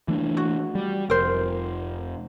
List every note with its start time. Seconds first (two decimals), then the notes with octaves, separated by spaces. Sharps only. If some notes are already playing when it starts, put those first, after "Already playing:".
0.08 E3 A3 D4
0.37 F#4
0.75 G3
1.10 F1 A#4 C5